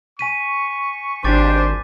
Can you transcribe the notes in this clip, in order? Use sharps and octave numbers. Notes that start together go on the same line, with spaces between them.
G#5 C#6 B6 D#7
G#1 D4 G4 C5 D6 A6